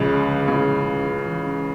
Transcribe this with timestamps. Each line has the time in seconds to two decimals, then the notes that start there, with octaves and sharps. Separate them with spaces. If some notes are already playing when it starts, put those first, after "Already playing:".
Already playing: C#2 C#3 F3
0.09 D3
0.29 D3
0.48 C#2 C#3 E4
0.68 F3
0.87 C#3
1.08 C#4
1.26 E3
1.47 C#4